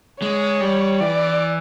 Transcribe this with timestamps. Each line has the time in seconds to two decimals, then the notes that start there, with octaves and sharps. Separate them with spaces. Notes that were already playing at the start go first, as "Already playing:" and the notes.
0.21 G#3 C#5
0.61 G3
1.00 E3 D5